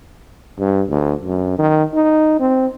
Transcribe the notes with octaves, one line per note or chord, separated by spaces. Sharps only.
G2
D2
F#2
D#3
D#4
C4